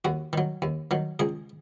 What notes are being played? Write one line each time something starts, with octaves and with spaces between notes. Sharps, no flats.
D#2 F#4
D#3 F#3
D#2
D#3 F#3
C#2 G#4